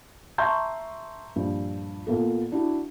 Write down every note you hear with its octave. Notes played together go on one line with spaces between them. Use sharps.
E5 A5 A#5 C6 C#6 G6
G2 A#2 F3
A#2 A#3 B3 A4
D4 E4 F#4